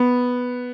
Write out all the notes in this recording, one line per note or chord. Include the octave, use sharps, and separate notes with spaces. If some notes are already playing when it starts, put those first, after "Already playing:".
Already playing: B3